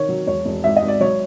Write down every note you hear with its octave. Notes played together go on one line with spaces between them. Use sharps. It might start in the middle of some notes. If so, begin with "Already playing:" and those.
Already playing: D#3 C#5
F#3
E1 C#5
E1
G#1 E5
D#5
G#1
D5
F#3 C#5